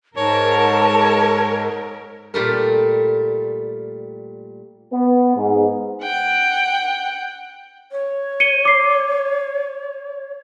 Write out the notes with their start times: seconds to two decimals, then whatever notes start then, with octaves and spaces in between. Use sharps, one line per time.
0.17 G#2 A#4 C#5 A5
2.34 A#2 G3 A3 A#4
4.93 B3
5.36 G#2
6.02 F#5 G5
7.92 C#5
8.40 C#7 D#7 G7
8.65 D6 C7